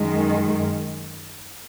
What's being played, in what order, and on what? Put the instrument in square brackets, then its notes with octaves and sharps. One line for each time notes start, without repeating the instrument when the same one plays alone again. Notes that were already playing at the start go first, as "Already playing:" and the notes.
Already playing: [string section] F#2 D#3 G#3